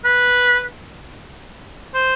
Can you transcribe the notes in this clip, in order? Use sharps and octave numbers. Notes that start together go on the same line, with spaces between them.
B4
C5